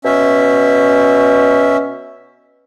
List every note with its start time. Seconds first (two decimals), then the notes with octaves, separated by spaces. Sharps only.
0.05 B2 C#4 E5